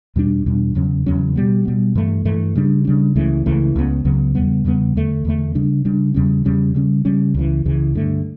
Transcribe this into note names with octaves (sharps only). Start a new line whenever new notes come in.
E2 B2 G3 D4
E2 B2 G3 D4
E2 C#3 F#3 C#4
E2 C#3 F#3 C#4
B2 G3 B3
B2 G3 B3
G2 E3 A3
G2 E3 A3
C#3 G3 D4
C#3 G3 D4
C#2 C#3 E3 A3
C#2 C#3 E3 A3
C#2 C#3 F#3 B3
C#2 C#3 F#3 B3
E2 C#3 G3 B3
E2 C#3 G3 B3
E2 D3 A3
E2 D3 A3
C#3 G3 D4
C#3 G3 D4
E2 C#3 G3 C#4
E2 C#3 G3 C#4
C#3 G3 C#4
C#3 G3 C#4
C#2 C#3 E3
C#2 C#3 E3
G2 D3 A3